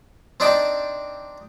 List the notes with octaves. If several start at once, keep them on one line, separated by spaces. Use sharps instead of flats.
C4 D4 D#4 D5 G5 A5